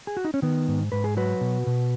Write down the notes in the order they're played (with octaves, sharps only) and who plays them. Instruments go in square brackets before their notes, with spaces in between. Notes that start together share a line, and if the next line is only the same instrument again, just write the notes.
[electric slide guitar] G#4
F#4
D#4
C#4
D#3 B3
G#2
G#2 B4
G#4
F#3 F#4 B4
B2
B2